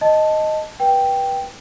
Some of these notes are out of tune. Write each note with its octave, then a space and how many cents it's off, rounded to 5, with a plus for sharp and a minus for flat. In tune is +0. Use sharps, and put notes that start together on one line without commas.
D#5 +0 A5 +0
B4 -25 G5 +0